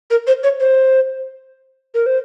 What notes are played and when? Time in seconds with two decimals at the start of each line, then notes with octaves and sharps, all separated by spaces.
0.11 A#4
0.27 C5
0.43 C#5
0.60 C5
1.94 A#4
2.06 C5